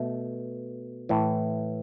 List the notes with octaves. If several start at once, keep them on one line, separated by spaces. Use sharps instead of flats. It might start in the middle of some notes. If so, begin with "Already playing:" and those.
Already playing: B2 A3
A2 E3